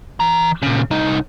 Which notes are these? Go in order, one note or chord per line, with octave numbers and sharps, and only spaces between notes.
E3 A#5
A#2 C#3
C2 D#4